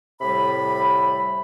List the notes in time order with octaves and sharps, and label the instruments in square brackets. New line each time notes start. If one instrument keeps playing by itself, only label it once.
[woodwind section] A2 C3 G3 B5